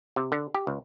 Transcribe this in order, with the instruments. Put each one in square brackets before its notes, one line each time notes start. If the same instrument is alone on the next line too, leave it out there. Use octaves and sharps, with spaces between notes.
[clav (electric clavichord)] C3
D3
G4
C#2